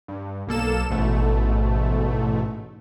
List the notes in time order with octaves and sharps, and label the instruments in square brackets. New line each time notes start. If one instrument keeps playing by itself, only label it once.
[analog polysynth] G2
B1 A#3 A4 E7
A1 G#2 B2 A3